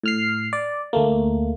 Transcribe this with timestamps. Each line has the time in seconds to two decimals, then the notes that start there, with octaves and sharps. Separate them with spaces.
0.03 A2 F6 C7
0.53 D5
0.93 D2 A3 A#3